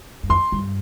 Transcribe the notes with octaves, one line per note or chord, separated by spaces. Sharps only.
G2
F2 C6
G2